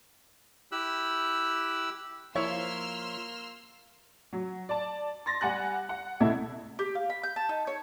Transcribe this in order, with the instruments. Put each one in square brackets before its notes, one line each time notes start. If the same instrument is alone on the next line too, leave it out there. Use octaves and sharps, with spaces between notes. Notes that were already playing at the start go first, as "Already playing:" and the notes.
[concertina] E4 G4 E6 F#6
[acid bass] F3 [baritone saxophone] A#3 [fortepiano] E4 C#5 [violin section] C6 E6 F6
[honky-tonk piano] F#3
D5 A5
C6 A6 A#6
G3 F#5 G#5 F#6
F#5
C#2 B2 E4 A4 G#6
[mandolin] G4
F5
B5
G6
A5
D#4
C#5